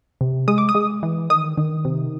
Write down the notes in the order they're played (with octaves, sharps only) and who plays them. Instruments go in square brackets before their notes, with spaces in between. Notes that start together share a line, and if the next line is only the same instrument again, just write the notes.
[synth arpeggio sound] C3
G#3 D#6
D6
D#6
G#3
E3
D#3 D#6
D#3
C3